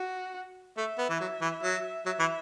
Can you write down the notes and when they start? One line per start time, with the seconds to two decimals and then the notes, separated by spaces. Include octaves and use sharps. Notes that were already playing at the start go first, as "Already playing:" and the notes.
Already playing: F#4
0.77 A3 E5
0.98 B3
1.10 E3
1.21 F#3
1.41 E3
1.63 F#3
2.06 F#3 E5
2.20 E3